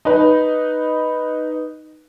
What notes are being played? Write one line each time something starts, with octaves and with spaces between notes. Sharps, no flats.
D#4 B4